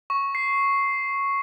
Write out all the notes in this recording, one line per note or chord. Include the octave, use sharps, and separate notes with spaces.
C#6
C7